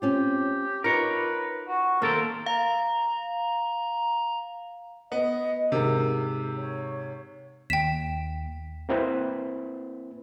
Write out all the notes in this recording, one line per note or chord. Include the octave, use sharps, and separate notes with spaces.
C4 C#4 F4 G4
D#4 F4 A#4 B4 C#5
F#4
D#3 A#3 C4 A4 A#4
F5 A#5
B3 D#5
G#2 C3 A#4
C#5
D#2 G5 B6 E7
A#3 C4 E4 B4 C5